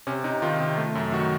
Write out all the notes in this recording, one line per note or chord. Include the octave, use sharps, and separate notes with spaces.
C3 C#4
C3 D#4
D#3 F4
C3
A3
F#2
D#3 F#4